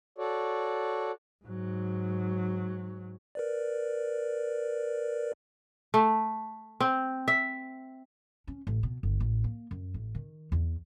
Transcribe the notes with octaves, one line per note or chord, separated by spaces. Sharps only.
F#4 A4 C#5 D5
G#2 F#3
A#4 B4 D5
A3
C4
E5
C#4
A1
B2
G1
A1
A#3
F#2
A1
D#3
E2